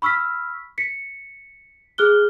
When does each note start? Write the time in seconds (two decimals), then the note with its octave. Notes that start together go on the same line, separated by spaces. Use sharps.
0.02 B5 C#6 E6 F6 B6
0.78 B6 C#7
1.98 G#4 F6 F#6 G7